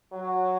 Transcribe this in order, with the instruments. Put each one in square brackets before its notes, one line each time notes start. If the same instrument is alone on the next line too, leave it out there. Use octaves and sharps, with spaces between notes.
[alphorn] F#3